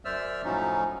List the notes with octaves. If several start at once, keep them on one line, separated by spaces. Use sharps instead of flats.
F#2 C5 D5 E5 E6 F6
A2 F3 F#3 C#4 D#4